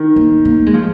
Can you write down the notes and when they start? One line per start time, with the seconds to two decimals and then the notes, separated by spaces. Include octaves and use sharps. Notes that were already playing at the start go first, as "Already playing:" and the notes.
Already playing: D#3
0.16 A#3
0.45 A#3
0.66 G#3
0.74 F3